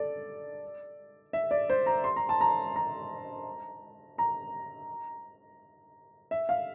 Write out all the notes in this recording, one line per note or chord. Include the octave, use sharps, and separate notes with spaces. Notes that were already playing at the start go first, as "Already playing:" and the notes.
Already playing: A4 D5
E5
D5
C5
A#5
C6
A#5
A5
A#5
A#5
A#5
E5
F5